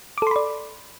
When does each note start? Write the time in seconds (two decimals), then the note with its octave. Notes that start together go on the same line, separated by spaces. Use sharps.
0.18 D6
0.22 A4
0.27 C6
0.31 B5
0.36 D5